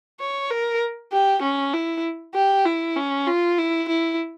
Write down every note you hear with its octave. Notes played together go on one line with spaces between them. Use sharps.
C#5
A#4
G4
C#4
E4
G4
E4
C#4
F4
E4
E4